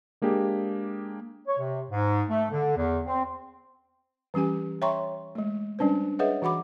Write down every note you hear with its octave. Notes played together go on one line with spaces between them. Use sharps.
G#3 A#3 D4 G4 G#4
C#5
C3
G#2
A3
D3
E2
C4
E3 G3 C#4 G4 G#5
C#5 E5 G5 A#5 C6 C#6
G#3 A3
G3 C#4 D4 B4 C5
G#4 B4 C#5 D#5 E5 F#5
E3 F#4 F#5 B5 D6